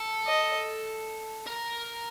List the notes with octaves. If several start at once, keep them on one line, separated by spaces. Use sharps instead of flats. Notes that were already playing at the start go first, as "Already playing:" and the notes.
Already playing: A4
D#5
A#4